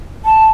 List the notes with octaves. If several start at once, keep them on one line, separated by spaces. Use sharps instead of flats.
A5